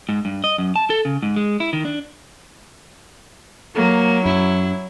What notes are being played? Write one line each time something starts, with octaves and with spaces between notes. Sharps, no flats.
G#2
G2
D#5
F#2
A5
A4
C#3
G#2
G#3
E4
D#3
D4
F#3 A#3
F#2 E4